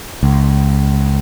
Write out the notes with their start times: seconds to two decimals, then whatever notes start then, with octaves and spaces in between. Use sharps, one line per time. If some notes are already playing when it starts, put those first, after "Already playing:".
0.23 C#2